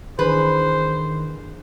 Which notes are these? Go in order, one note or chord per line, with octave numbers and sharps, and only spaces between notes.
D#3 E3 D4 G#4 B4 C5